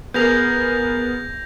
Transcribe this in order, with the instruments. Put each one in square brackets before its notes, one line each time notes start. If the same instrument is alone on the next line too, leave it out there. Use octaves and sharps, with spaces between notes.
[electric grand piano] B3 G#4 A#4 [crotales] G6 A#6 F7